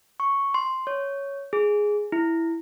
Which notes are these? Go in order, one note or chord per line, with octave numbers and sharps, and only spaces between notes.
C#6
C6
C#5
G#4
E4